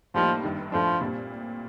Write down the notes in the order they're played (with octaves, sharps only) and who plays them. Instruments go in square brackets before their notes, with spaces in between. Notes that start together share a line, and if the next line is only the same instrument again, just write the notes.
[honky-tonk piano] A2 G3 A#3 D#4 G4 [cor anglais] F3
[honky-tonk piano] G1 G2 D#3
[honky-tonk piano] A2 A3 D4 [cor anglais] F3
[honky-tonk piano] A#2 G3 C4